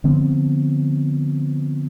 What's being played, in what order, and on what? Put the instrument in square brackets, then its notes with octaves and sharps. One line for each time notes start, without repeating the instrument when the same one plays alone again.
[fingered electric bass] D3 F3 B3 C4